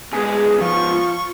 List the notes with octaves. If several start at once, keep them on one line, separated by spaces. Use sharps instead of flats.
G#2 G#3 B3 G#4
F3 F4 C#6